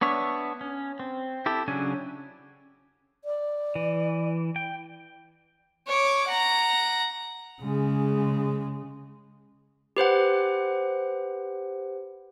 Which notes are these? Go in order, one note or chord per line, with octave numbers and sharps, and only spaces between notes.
B3 D4 C#5 E5
C#4
C4
E4 G4 A4
C#3 F#3 C#4 D4 G#5
D5
E3
G5
C#5 D6
F#5 A#5
C#3 G#3
G4 B4 C5 F#5